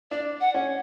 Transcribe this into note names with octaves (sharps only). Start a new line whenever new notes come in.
D4 D5
F#5
C#4